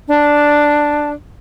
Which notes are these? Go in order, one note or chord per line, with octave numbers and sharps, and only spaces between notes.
D4 A5